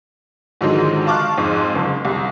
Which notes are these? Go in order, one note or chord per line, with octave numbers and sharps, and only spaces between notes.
G#2 D3 D#3 F3 F#3 G#3
F5 A5 C#6 D6 F6 F#6
F2 G#2
F#1
C2